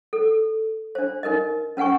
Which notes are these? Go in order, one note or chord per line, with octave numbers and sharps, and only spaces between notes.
A4
D4 C5
D#4 A#4 B4 D#5
C#4 B4 F#5 G#5 C#6